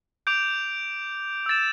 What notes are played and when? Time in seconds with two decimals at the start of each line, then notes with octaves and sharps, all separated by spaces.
0.27 D6 G6 D7 F7
1.46 E6 A6 E7